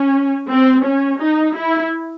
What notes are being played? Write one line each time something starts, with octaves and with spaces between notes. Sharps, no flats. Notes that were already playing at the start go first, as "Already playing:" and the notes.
Already playing: C#4
C4
C#4
D#4
E4